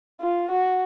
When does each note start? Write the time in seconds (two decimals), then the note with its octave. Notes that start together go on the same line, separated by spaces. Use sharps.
0.21 F4
0.51 F#4